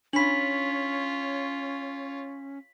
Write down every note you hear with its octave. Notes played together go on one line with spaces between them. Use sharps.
C#4 D4 F4 C#5 B5 B6 F#7